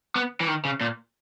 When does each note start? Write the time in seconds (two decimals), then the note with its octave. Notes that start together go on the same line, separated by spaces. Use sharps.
0.16 B3
0.40 E3
0.48 D#3
0.65 C#3
0.81 A#2